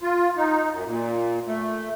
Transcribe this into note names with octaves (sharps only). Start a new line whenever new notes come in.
F4
D#4
F#2
A#2
A3